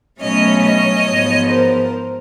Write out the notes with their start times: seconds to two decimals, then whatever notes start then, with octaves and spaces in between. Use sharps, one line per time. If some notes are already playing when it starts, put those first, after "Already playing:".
0.21 B2 F#3 A3 C#4 C#5 D#5
0.63 C#5 D#5
1.07 G#2 F3 G#3 B3
1.49 A#4 C5